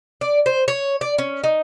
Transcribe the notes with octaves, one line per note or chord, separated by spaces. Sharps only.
D5
C5
C#5
D5
C#4
D#4